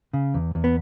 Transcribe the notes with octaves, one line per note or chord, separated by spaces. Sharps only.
C#3
E2
E2
B3